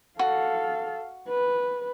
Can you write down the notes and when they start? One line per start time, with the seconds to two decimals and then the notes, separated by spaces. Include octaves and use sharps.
0.19 F#4 A4 F5
1.29 B4